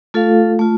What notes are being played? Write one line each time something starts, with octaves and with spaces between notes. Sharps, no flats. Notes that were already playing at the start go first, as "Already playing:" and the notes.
A3 F4 A4 F5
A3 F4